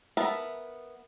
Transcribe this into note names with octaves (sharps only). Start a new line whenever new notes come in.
B3 A#4 E5 A5 B5